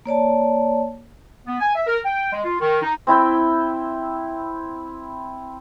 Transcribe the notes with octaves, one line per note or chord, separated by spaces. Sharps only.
A#3 C#5 D5 A5
B3
G#5
E5
A#4
G5
G#3
F4
D#3
D#4
C4 E4 E5 G5